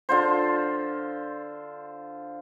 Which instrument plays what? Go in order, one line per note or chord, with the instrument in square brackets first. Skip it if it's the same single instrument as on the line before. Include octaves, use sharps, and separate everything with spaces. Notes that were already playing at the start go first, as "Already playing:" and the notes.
[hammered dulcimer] D3 F4 C5